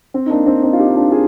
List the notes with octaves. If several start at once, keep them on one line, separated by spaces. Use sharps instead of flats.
C4
D#4
A#3 D4
C4 D#4
C4 D#4
F4
D#4 G4
D#4
D4 F4
F4 G#4